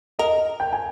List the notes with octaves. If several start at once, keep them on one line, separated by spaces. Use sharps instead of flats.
A#4 D#5
G5
G#5